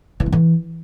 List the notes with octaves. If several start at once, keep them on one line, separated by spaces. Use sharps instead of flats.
E3
C4
E3